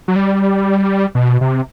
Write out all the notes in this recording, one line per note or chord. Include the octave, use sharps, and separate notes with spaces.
F#3
G3
B2
C3